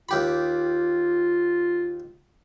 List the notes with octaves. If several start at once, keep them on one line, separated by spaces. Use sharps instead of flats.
D#2 F4 G4 B5